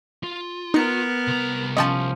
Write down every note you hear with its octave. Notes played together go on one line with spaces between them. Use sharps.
F4
B3 D#4 A#4 C#7
C2 A#5
F3 C#4 D#5 G5 A5